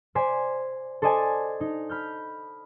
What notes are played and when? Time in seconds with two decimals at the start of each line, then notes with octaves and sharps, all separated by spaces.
0.15 C5 D5 G#5 B6
1.02 A4 C5 D5 D#5 G#5 A5
1.60 D#4
1.89 B5 F6 G6